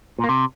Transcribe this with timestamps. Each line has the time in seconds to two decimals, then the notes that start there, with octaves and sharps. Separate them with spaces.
0.19 A#2
0.24 A#3
0.29 C3